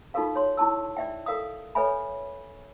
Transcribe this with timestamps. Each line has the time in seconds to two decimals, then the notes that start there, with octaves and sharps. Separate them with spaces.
0.14 D#4 F4 F#4 A4 A#4 F5
0.36 C#5 C6
0.57 E4 G4 A5 E6
0.97 D5 E5 G5
1.26 A4 A#4 F5 D#6
1.75 A4 B4 C#5 E5 G#5 B5